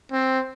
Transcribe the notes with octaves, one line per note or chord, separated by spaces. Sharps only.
C4